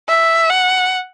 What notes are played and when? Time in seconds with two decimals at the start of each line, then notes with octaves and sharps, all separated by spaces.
0.08 E5
0.50 F#5